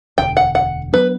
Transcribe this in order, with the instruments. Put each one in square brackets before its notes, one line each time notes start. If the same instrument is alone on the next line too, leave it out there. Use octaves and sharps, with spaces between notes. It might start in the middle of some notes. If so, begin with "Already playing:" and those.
[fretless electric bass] E1 D2 D3 [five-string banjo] G5
[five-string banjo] F#5
F#5
[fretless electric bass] F#3 B3 D4 [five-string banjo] B4